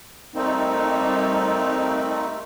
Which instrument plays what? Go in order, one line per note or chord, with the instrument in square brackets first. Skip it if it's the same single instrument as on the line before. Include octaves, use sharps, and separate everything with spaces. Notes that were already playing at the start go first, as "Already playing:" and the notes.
[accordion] G3 A3 A#3 C4 D#4